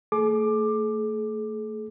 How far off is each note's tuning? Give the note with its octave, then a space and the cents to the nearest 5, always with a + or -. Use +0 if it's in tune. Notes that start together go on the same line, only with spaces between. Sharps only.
A3 +30 G#4 +45 D6 +15